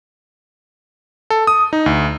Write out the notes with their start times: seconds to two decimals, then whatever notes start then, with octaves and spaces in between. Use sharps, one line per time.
1.30 A4
1.47 D#6
1.73 D#4
1.86 D2